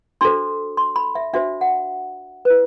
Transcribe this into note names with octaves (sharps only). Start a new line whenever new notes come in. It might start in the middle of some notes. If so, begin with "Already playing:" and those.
D4 F#4 A4 C5 C6
C6
B5
E5
D4 F#4 C5 E5
F#5
E4 B4